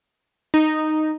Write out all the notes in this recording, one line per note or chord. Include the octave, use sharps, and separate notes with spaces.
D#4